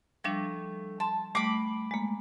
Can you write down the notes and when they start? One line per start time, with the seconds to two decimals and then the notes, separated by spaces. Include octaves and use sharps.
0.24 F3 G3 A3 D4
1.00 A5 C6
1.35 G3 A3 B5 D6
1.91 G#3 A#3